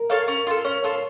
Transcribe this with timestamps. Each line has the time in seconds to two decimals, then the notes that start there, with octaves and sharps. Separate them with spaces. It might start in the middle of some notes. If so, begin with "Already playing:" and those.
Already playing: A#4
0.10 A4 C#5 F5
0.28 C#4
0.47 F4 A4
0.65 C#4 C#5
0.83 F4 A4 C#5